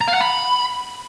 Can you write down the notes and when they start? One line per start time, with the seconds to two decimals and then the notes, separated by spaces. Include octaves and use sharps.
0.01 A#5
0.08 F5
0.14 F#5
0.21 B5